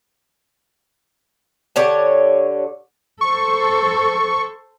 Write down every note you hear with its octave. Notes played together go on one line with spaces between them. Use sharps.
D3 G4 C#5 A5
A4 C5 C#6